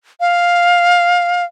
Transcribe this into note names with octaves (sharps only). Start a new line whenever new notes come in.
F5